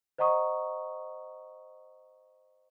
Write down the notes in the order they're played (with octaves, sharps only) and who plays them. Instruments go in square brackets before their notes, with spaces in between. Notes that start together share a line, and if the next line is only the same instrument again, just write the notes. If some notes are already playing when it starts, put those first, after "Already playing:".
[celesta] C5 D#5 F#5 A#5 C#6 D#6